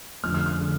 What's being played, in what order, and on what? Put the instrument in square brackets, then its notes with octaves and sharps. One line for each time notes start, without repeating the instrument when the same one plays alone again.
[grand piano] F1 F2 D3 F6
F6
F6
D3